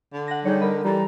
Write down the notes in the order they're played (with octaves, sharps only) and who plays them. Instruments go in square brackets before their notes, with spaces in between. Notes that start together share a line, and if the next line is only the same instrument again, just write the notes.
[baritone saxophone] D3
[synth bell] F#5 A#6
[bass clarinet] G3 [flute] D#4 [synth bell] G#4 C#5
[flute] A#4 [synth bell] D#5 B5
[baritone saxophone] E3 [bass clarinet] G3 [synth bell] G4 A4 [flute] A#5